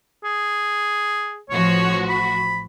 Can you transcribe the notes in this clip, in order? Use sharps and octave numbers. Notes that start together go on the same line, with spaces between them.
G#4
A1 F3 F#4 C#5
B5